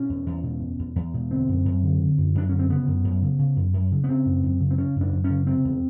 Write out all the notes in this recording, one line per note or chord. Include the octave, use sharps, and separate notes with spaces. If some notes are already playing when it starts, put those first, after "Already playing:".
Already playing: B2 C#4
E2
E2
B2
B2
E2
E2
B2
D3 C4
F#2
F#2
D3
D3
F#2
F#2 D4
D3 C#4
C4
C#3 B3
F#2
F#2
C#3
C#3
F#2
F#2
C#3
B3
C#3 C4
F#2
F#2
C#3
C4
C#3 C#4
F#2
D4
F#2
C#4
C#3
C3 C4
E2